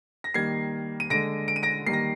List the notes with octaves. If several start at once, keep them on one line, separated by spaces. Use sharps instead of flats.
A#6
D#3 G3 A#3 G#6 C7
D#7
D3 G#3 A#6 D7
D7
D#7
A#6 D7
D#3 G3 A#3 C7
A#6